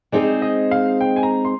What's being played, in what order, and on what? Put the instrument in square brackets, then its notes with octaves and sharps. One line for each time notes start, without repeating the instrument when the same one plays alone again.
[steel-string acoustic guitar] G#3 C4 D#4 G#4 C5 [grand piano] D5
[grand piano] D#5
F5
G5
G#5
A#5
C6